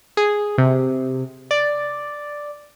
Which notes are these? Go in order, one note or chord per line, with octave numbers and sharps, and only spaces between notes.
G#4
C3
D5